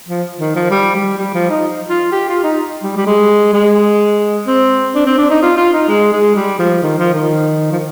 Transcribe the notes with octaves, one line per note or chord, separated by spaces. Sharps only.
F3
D#3
F3
G3
G3
G3
F3
D#4
F4
G4
F4
D#4
G3
G3
G#3
G#3
C4
D4
C4
D4
D#4
F4
F4
D#4
G#3
G#3
G3
F3
D#3
F3
D#3
F3